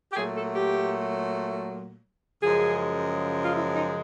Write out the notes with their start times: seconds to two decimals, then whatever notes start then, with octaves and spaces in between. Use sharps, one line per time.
0.12 G4
0.16 A#2 F#3 A3 G#4
0.35 A4
0.54 G4
2.42 F#2 C#3 F3 G#3 G#4
3.44 F4
3.56 E4
3.74 D#4